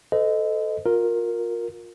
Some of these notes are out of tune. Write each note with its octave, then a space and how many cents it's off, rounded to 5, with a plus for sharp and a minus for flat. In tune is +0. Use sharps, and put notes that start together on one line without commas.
A4 +0 C5 -45 D#5 +0
F4 +30 A#4 +0